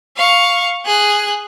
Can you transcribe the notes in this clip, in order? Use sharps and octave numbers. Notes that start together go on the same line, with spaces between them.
F5 C#6
G#4 F#6